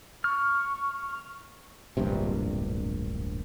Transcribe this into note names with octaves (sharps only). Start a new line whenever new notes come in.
C#6 F6
D1 A#1 G2 C3